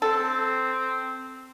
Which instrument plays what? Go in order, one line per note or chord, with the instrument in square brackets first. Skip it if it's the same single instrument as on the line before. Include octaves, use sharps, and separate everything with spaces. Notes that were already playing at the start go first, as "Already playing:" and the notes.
[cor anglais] C4 [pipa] A4